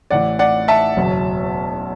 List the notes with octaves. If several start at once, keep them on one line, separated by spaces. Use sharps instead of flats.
A1 A2 E3 D5 F#5
D5 F#5
E5 A5
F#1 E2 B2 F#3